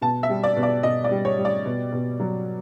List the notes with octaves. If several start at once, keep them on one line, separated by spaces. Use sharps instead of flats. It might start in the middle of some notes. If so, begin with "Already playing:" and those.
B2 A5
E5
G3
D5
B2
D5
B2 D#5
D5
G3
C#5
G3
D5
B2
B2
F#3